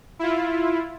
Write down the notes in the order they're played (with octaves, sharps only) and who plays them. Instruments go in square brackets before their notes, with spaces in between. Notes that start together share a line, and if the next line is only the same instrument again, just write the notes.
[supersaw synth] E4 F4